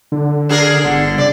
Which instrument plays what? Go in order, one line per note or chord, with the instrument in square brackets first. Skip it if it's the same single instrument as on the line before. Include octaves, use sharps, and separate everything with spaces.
[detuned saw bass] D3
[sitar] D4 G#4 A#4
[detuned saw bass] G1 [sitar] D3
[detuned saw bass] C#3 [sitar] D5